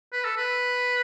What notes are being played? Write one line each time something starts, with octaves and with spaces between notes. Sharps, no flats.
B4
A4
B4